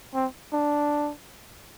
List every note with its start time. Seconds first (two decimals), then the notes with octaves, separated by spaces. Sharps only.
0.14 C4
0.53 D4